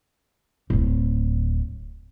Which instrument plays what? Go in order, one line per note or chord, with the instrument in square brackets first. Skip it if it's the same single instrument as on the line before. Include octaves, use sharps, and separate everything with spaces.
[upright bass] D1 A2